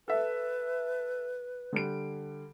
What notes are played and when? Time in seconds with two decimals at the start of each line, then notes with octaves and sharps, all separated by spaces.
0.08 A4 B4 E5
1.73 D3 G3 D7